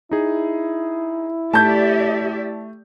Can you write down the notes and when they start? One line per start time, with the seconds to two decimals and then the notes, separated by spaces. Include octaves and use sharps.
0.11 D#4 E4 G#4
1.53 A3 G4 D5 E5 A5 G6